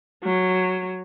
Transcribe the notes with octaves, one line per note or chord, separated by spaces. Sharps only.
F#3